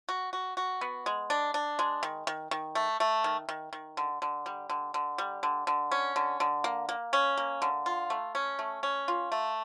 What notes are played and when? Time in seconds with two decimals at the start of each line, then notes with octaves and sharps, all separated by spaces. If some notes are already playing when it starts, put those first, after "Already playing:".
0.09 F#4
0.33 F#4
0.57 F#4
0.81 B3
1.06 G#3
1.30 D4
1.54 D4
1.79 G#3
2.03 D#3
2.27 D#3
2.51 D#3
2.75 A3
3.00 A3
3.24 D#3
3.49 D#3
3.73 D#3
3.97 D3
4.22 D3
4.46 G3
4.70 D3
4.94 D3
5.18 G3
5.43 D3
5.67 D3
5.91 C#4
6.16 D3
6.40 D3
6.64 A#3
6.89 A#3
7.13 C#4
7.37 A#3
7.62 D3
7.86 F4
8.10 A3
8.35 C#4
8.59 A3
8.83 C#4
9.08 F4
9.32 A3